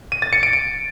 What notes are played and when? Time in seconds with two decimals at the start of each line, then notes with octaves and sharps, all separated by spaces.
0.12 D#7
0.22 A6
0.33 C#7
0.43 D7
0.53 D7